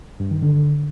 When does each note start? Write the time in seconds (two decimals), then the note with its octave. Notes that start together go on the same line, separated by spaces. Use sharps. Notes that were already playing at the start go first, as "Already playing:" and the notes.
0.20 G2
0.31 D#3
0.42 D3